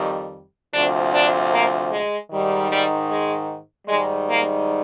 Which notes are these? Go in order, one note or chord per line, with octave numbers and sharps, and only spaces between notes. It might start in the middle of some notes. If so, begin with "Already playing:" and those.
Already playing: F2 D#3 G3
D2 C3 F3 D4
D4
A#3
G#3
G#2 D#3 G3
G3
G#3
G#2 D#3 G3 G#3
A#3